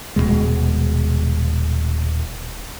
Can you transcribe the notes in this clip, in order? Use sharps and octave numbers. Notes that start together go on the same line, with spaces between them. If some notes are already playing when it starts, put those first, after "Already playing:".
D#1 E2 B2 G#3